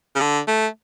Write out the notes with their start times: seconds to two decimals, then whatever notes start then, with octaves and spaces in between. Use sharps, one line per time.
0.15 C#3
0.21 D3
0.48 A3